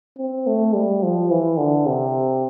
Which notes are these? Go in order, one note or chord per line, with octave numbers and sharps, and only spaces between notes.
C4
A3
G3
F3
E3
D3
C3